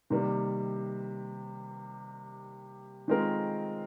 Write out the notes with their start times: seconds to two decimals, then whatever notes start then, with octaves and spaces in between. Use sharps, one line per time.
0.10 C3 D#3 G3 A#3
3.08 D#3 G#3 C4 F4 A#4